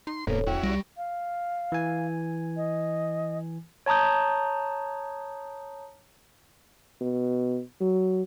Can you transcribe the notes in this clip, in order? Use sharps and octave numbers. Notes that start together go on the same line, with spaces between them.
D#4 C6
D1 G2 B2 A#3 A4 C5 C#5
E2 C#4 E4 F#4 G5
C2 G3 C#6 A#6 D7
F5
E3 G#5
D#5
C#5 A5 A#5 D#6 G6
B2
F#3